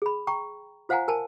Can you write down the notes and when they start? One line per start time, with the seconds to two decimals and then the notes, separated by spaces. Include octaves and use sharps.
0.02 G#4 B5
0.27 G5 A#5 C#6
0.89 F4 C5 F5 F#5 G#5 A#5
1.08 A#4 G#5 A5